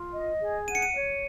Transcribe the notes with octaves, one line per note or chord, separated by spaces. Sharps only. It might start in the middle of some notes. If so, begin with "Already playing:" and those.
Already playing: F4
D#5
G#4
F#5 D#7
C#7
D#7
C#5